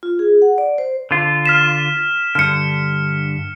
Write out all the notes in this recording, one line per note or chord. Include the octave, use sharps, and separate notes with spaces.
F4
G#4
F#5
D5
C5
D3 F4
F6 B6 E7
G2 D3 F6 C#7